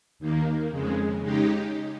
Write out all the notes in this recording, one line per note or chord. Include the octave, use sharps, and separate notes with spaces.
D#2 D#3 A#3
F2 C#3 G#3
C#3 G#3 D#4 G4